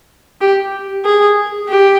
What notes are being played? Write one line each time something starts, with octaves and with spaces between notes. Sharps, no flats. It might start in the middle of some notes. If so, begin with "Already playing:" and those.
G4
G#4
G4